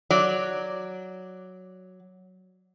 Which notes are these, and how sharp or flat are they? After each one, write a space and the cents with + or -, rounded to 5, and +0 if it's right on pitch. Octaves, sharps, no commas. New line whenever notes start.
F#3 +0 D5 +0